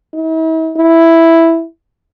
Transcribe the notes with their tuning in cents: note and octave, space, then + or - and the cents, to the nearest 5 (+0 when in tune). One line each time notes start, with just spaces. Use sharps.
E4 -45
E4 +0